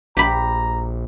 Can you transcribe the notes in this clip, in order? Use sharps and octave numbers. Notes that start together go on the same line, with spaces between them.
A#1 G4 A#5 B5